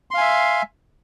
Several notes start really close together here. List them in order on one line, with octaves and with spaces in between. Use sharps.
C6 F5 G#5 E5